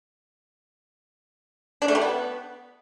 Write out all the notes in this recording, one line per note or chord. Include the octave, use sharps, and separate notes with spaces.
D4
A3
G3
B3